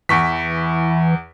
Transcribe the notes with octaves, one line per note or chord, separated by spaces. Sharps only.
E2 E3 C#6 B6